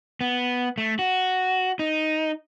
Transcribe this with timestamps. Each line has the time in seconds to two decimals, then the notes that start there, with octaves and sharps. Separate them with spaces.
0.21 B3
0.78 A3
0.99 F#4
1.79 D#4